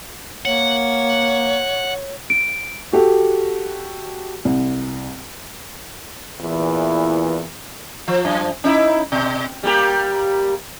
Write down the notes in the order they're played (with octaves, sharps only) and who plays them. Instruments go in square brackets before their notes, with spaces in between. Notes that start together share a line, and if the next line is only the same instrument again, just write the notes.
[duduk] A#3 [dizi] C#5 [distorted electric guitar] F#5
[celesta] D7
[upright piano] F#4 G4 A4
C2
[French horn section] E2 A#2 E3
[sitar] F3
F#2 F3
C#4 D#4 E4
B2
G3 A#3 G4